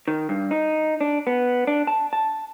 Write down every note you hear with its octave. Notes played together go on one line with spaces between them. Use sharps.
D#3
G2
D#4
D4
B3
D4
A5
A5